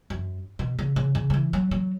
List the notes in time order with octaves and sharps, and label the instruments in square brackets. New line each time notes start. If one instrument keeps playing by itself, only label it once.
[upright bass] F#2
B2
C#3
C#3
C#3
F#3
E3
F#3
F#3